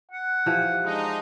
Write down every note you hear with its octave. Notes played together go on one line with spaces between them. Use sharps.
F#5
E3 F3 G4
G#3 D4 D#4